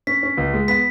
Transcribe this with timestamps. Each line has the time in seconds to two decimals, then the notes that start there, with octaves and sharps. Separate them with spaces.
0.07 C#4 B6
0.23 C#4
0.37 C#2
0.54 G#3
0.68 B3 B6